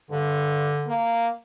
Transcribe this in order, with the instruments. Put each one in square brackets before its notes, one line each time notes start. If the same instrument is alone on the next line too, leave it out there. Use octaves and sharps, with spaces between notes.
[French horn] G2 [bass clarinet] D3
[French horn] A#3